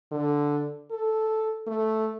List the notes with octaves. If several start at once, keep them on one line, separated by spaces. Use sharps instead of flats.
D3
A4
A3